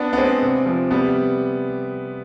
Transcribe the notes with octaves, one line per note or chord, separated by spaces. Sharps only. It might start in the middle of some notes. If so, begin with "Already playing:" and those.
Already playing: B3 D4
B3
G#3 C4
C3
F3
C3 G3 B3